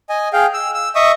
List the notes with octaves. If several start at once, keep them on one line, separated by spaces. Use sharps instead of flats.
D#5 G#5
G#4 F5 G5
E6
E6
D#5 E5 C#6 D#6